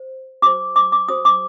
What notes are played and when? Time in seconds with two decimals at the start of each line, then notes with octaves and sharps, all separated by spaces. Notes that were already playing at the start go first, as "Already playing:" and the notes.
Already playing: C5
0.42 F#4 C5 D6
0.76 D6
0.92 D6
1.08 F#4 C5 D#6
1.25 D6